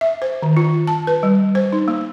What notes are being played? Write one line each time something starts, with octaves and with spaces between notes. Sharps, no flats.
E5
C5
D#3
F4
A5
B4
G3
C5
D#4
A#3